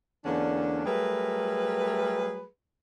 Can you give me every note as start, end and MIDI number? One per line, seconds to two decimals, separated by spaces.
0.25 0.84 40
0.25 0.84 50
0.25 0.84 58
0.25 0.84 61
0.25 0.84 62
0.86 2.45 54
0.86 2.45 55
0.86 2.45 57
0.86 2.45 68
0.86 2.45 70
0.86 2.45 71